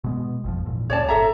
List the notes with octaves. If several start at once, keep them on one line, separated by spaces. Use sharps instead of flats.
B2 G#3 B3
G#1 F2 F3
G#1 E2 A#2
C#2 A2 C#4 C#5 D5 A5
G1 A4 E5 A#5